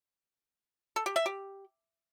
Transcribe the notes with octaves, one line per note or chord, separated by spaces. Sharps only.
A4
G4
E5
G4